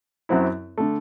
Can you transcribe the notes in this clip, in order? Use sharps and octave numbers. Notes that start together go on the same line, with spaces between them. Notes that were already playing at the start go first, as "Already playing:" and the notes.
F#2 F#3 C4 E4
D3 A3